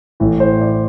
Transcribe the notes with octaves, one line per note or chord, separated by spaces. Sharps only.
A1 A2 E3
C5
D5